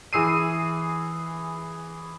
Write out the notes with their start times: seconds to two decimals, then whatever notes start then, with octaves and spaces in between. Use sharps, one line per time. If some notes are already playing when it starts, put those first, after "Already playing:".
0.13 E3 G#4 E6 C7 D#7